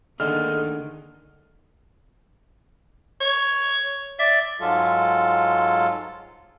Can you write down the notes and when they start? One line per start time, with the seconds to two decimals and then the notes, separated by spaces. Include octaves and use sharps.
0.20 D2 D3 D#3 A#3 G#4 A4 D#5 F6
3.21 C#5
4.19 D5 E5
4.60 G#2 F#3 G#3 F4 A4